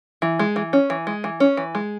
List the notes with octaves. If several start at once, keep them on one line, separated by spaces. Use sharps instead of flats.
E3
G#3
E3
C#4
E3
G#3
E3
C#4
E3
G#3